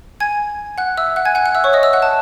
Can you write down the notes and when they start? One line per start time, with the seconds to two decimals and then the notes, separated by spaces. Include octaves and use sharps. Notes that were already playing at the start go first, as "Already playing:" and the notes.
0.20 G#5 G#6
0.78 F#5 F#6
0.97 E5 E6
1.16 F#5 F#6
1.25 G#5 G#6
1.35 F#5 F#6
1.46 F#5 F#6
1.55 E5 E6
1.64 C#5 C#6
1.73 D#5 D#6
1.83 E5 E6
1.93 F#5 F#6
2.02 A5